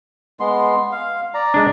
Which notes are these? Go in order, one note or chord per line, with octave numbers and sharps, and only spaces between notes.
G#3 B3 C6
F5
D5 A#5
G#3 D4